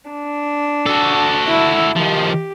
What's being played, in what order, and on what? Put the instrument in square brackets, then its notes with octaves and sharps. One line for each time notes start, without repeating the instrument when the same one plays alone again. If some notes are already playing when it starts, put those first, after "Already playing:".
[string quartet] D4
[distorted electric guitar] F#4 A4
[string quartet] E4
[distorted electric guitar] D#3 F3 [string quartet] G4